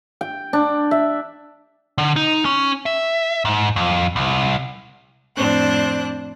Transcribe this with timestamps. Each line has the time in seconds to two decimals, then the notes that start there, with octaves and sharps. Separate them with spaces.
0.21 G5
0.53 D4
0.91 E5
1.98 D3
2.16 D#4
2.45 C#4
2.86 E5
3.45 G#2
3.76 F2
4.16 C2
5.36 F2 A2 C4 D4 C5 F#6